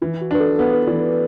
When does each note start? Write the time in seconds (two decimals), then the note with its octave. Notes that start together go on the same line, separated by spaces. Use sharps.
0.01 E3 E4
0.14 E4
0.21 F#4
0.31 D4 B4
0.40 A4
0.58 B3 A4
0.73 B4
0.87 E3 D5
1.00 B4